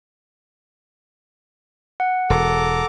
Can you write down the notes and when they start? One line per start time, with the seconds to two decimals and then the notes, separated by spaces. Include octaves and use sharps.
2.00 F#5
2.30 E1 A4 A#5 D6